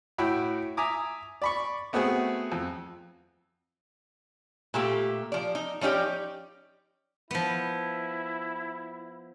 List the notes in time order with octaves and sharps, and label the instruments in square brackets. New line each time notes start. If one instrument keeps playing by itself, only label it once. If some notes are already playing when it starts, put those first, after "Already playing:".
[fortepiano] A2 E4 F#4 G5 B5
E5 G#5 A#5 D6 D#6
D5 B5 C#6
A3 B3 C4 F#4 G#4
F2
[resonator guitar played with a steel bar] A#2 A3 G4
F3 D5
D#4
F3 C#4 D#4 G4 D5
[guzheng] F3 B3 [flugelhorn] E4